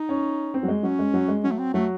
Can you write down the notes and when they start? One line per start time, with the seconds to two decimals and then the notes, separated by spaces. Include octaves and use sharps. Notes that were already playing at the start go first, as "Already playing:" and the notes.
Already playing: D#4
0.09 C#4
0.54 C4
0.63 F#3
0.68 G#3
0.83 F#3 C#4
0.99 G#3
1.14 F#3
1.28 G#3
1.44 F#3 C#4
1.51 A3
1.59 C4
1.74 F#3 A3